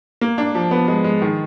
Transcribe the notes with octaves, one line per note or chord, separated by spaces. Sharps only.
A#3
D4
F3
B3
G#3
G#3
D#3